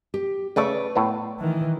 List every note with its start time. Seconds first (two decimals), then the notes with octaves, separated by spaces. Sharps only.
0.14 G4
0.56 C#3 A3 A4 B4 C#5 D5
0.96 A2 A3 B3
1.39 D#3 E3